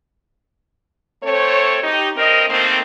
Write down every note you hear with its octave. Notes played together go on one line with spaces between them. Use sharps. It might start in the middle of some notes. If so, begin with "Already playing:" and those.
A3 C4 A4 C5 C#5
D#4 G4
G2 C4 A#4 D#5
D#3 A3 A#3 C4